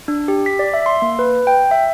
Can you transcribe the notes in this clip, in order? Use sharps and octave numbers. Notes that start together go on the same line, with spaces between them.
D4
G4
B6
D5
E5
C6
A#3
B4
G5
E5